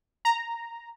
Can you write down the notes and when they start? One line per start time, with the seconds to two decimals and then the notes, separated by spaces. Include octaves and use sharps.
0.25 A#5